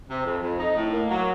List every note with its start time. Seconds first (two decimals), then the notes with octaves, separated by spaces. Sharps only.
0.09 C3
0.26 F2
0.42 F2
0.59 D#4
0.76 A2
0.93 A#3
1.10 F#3